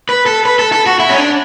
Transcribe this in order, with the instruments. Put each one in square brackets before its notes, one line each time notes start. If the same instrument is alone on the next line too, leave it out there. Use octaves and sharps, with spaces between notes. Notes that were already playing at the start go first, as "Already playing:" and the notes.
[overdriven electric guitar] B4
A4
B4
A4
A4
F#4
E4
C#4
D4